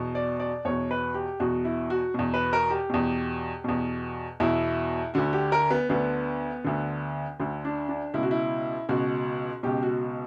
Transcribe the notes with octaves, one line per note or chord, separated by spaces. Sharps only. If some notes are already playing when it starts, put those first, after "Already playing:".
Already playing: E2 B2
D5
D5
E2 B2 C#5
B4
G4
E2 B2 F#4
E4
F#4
E2 B2
B4
A#4
G4
E2 B2
E2 B2
E2 B2 E4
D2 D3 F#4
G4
A#4
B3
D2 D3 B3
D2 D3
D2 D3
D4
D4
C#2 B2 E4
F#4
E4
C#2 B2 F#4
C#2 B2 G4
F#4